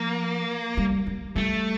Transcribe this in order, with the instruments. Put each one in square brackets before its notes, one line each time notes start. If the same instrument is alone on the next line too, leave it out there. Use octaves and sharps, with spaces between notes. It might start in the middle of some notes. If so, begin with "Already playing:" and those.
Already playing: [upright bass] F3 [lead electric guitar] A#3
[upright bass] G3
G3
[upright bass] G3 [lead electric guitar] A3